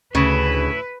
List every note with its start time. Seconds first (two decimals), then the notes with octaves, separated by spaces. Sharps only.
0.15 D2 A2 C#3 E4 B4